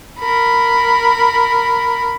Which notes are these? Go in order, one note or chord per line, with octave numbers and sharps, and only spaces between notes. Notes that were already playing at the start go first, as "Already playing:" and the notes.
A#4 B5